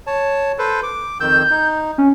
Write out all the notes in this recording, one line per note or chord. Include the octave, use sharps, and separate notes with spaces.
C#5 A5
A4 B4 C5
D6
F2 D#3 E6 G6
D#4
C#4